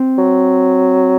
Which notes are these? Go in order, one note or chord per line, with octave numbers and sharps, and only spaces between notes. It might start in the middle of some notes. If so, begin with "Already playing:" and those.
Already playing: C4
F#3